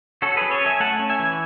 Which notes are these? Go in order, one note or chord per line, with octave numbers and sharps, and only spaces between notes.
C#4 F#4 A4
F#3 G#4 B4
A4 C#5
C#4
E5 G#5
A3 F#5 A5
C#4
E5 G#5
E3